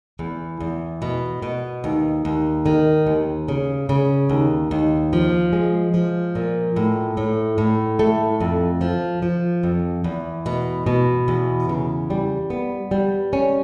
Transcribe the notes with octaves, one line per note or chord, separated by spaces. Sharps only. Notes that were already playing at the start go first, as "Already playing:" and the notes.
E2
E2
B2
B2
D#2
D#2
D#3
D#2
C#3
C#3
D#2
D#2
F3
G#3
F3
A#2
A2
A2
A2
A3
F2
F3
F3
F2
E2
B2
B2
E2
C#3
G3
B3
G3
C#4